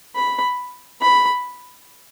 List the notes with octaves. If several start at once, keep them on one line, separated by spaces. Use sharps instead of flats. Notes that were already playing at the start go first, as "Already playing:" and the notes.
B5
B5